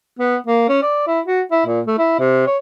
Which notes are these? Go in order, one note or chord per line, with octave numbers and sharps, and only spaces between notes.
B3
A#3
C#4
D5
E4
F#4
E4
A#2
A3
E4
C3
C#5